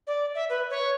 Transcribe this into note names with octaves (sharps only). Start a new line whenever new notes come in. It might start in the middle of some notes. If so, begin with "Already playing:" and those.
D5
E5
B4
C#5